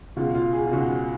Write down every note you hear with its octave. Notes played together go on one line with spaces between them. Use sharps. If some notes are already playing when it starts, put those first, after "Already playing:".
C#2 B2 F4
F4
G#4
F4
C#2 B2 F#4